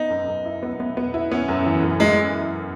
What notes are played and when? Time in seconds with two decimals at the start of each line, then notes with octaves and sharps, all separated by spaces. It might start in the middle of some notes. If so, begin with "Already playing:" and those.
Already playing: B3 D#4
0.10 F#2
0.28 F#2
0.45 E4
0.63 B3
0.80 B3
0.97 B3
1.14 E4
1.32 B3 C#4
1.49 F#2
1.66 E3
1.83 F#2
2.00 G#3 E4